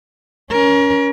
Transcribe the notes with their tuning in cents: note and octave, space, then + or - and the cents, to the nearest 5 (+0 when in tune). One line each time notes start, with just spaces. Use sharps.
C#4 +20 A#4 +30